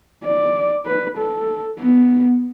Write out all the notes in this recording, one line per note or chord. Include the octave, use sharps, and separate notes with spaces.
D5
B4
A4
B3